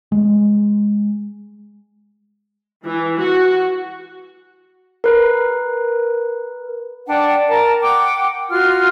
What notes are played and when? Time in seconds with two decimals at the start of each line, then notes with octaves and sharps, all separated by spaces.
0.12 G#3
2.85 E3
3.20 F#4
5.04 A#4 B4
7.07 D4 D5 F#5 G5
7.49 A#4 A5 A#5
7.81 F#5 G5 D6
8.50 F4 F#4 F6